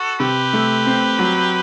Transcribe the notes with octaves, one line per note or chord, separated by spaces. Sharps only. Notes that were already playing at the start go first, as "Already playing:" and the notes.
Already playing: F#4 A4
C3 G4 B4
A3
C4
F#3